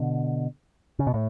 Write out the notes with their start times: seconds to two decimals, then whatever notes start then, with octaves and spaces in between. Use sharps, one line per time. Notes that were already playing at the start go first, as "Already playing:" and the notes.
Already playing: B2 D3
0.99 C#3
1.07 B2
1.14 A2